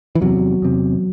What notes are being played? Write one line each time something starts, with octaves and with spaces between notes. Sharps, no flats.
E3
E2 C3 F#3
E2 C3